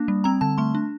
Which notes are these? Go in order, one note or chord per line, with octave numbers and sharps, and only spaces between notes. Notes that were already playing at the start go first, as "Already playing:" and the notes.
Already playing: A#3 D4
G3
C4 A#5
D3 A5
A3 C6
D4